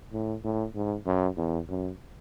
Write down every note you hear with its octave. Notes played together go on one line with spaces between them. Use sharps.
A2
A2
G#2
F#2
E2
F#2